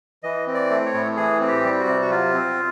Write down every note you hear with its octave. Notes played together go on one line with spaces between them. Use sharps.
E3 D#5
C4
D5
A3
C#5
A2
E3 G#4
C4
G4
G3
F#4
C3
F#4
F#3 F4
C4